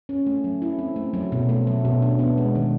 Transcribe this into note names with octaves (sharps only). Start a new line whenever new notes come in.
C#4
A3
F#3
E4
C4
A3
F#3
B2
A3
F#3
B2
D4
B3
G#3
D#3